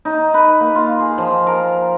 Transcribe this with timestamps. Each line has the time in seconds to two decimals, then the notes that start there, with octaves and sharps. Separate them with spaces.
0.05 D#4
0.34 B4
0.60 A#3
0.75 F4
1.00 G#4
1.18 F3
1.47 A#4